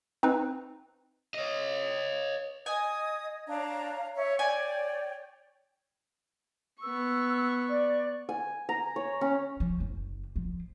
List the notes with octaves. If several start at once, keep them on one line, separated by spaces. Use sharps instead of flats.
C4 D#4 B4
C#5 D#5
D#5 G#5 D#6
D4 C#5 F5 A#5
C#5 E5
C#5 D5 G5 G#5
B3 C#6 E6
D5
G#5
A#5
C#5
C#4
F3
F#1
F3